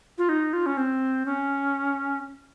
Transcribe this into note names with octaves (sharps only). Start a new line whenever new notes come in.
F4
D#4
F4
C#4
C4
C#4